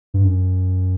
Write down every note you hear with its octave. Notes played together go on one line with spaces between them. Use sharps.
G2
F#2